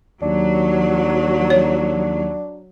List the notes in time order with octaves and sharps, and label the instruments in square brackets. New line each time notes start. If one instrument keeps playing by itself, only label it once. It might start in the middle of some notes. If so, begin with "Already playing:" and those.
[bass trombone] D#2 [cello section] F#3 [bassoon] D4
[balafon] C#5